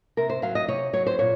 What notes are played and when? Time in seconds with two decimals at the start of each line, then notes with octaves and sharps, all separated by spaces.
0.17 C3 A#4
0.30 C5
0.42 F#3 F5
0.55 D#5
0.68 C3 C#5
0.93 F#3 C#5
1.07 C5
1.19 A#2 C#5